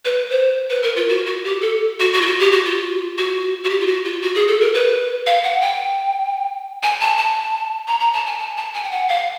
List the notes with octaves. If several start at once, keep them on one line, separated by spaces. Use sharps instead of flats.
B4
C5
B4
A#4
F4
F#4
F#4
G4
A4
F#4
F#4
F4
F#4
G4
F#4
F4
F#4
F#4
G4
F4
F#4
F4
F#4
G#4
A4
A#4
B4
F5
F#5
G5
G#5
A5
A5
A#5
A#5
A5
G#5
A5
A5
G#5
G5
F#5
F5